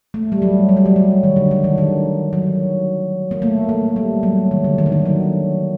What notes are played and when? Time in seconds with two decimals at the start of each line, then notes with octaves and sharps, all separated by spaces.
0.14 A3
0.32 G3
0.42 F#3
0.69 F#3
0.77 G3
0.86 F#3
0.96 F#3
1.23 D#3
1.36 D3
1.51 D3
1.64 D#3
1.78 D#3
2.33 F#3
3.31 A#3
3.42 A3
3.69 A3
3.96 G3
4.23 F#3
4.51 D#3
4.64 D3
4.78 D#3
4.86 D3
4.92 D#3
5.06 F#3